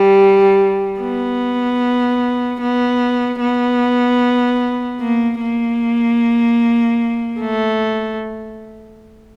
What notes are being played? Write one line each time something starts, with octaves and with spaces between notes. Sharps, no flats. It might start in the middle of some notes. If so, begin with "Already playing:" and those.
Already playing: G3
B3
B3
B3
A#3
A#3
A3